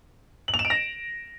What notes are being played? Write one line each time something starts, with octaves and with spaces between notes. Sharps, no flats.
F#7
F7
E7
D7
A#6